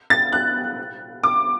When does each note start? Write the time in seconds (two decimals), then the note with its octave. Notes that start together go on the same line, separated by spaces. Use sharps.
0.10 A6
0.33 F#6
1.23 D6